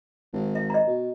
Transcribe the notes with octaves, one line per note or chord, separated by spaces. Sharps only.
G#1
E5
D#5 A#5
B2